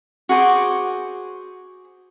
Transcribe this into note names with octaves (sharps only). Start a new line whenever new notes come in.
F#4 G#4 C5 D6